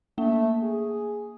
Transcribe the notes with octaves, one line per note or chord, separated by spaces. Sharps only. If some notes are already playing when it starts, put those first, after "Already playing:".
A3 A#3
G#4